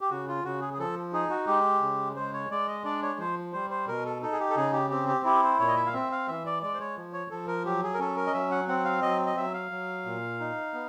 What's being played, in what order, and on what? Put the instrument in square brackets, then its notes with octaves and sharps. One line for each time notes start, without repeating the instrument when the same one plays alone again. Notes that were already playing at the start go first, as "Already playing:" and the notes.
[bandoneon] G4
C#3 F#4
F4
C#3 F#4
G#4
G#4
F3 A4
D#4 G#4
F#4
G#3 G4
C#3
G#3 C5
C#5
G#3 D5
D#5
D4 D5
C#5
F3 C5
G3 C5
C5
B2 A#4
A4
D#4 A4
G#4
G4
A4
C#3 G#4
G4
C4 G4
G4
E4 G4
C5
A#2 C#5
D#5
E5
F5
C4 E5
F5
E3 E5
D5
G#3 D5
C5
C#5
F3
C#5
F3 A4
A#4
F#3 G4
G#4
A#4
C#4 A4
A#4
D#5
F#3 E5
F#5
C4 F#5
F5
F#3 D#5
D#5
F#3 E5
F5
F#3
A#2
D#4
B3